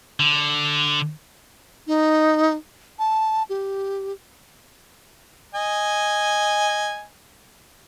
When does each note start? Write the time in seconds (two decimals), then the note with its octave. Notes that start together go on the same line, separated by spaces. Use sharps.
0.20 D3
1.86 D#4
2.99 A5
3.49 G4
5.55 D#5 G#5